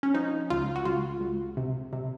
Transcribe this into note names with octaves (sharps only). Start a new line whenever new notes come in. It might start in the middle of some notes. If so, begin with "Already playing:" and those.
C#4
F3 D#4
C#2 F4
F#4
C#2 F4
C#2
C3
C3